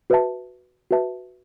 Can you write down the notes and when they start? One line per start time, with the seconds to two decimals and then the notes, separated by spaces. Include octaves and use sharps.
0.10 F#4 B4 E5 A5
0.91 F#4 B4 E5 A5